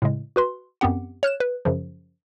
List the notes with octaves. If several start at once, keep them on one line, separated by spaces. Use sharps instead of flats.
A2 C#3 G#3
F#4 B4 C6
F#2 B3 C4 G4 F#5
C#5 F6 F#6 E7
B4
F#2 C#3 F3